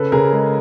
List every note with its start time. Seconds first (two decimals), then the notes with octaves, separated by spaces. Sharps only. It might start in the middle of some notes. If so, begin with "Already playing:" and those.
Already playing: C#3 A4 B4
0.12 C#3 G#4 A#4
0.33 G#3